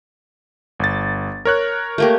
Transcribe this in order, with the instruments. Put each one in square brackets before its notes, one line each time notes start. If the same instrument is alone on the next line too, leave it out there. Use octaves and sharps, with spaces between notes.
[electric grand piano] G1 A6
A#4 C#5 F#6
[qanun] A3 A#3 G4